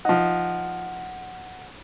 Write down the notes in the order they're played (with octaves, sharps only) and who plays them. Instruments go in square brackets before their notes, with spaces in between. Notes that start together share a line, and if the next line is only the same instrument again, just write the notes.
[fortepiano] F3 D#4 [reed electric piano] F#5